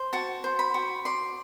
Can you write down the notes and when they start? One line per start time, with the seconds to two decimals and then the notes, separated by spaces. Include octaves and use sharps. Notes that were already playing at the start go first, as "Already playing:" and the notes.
Already playing: C5
0.13 F#4 A5
0.44 C5
0.59 B5
0.74 F#4
1.05 D5 C6